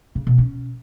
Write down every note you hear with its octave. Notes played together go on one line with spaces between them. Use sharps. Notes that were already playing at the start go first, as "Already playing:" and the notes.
C#3
B2
C#4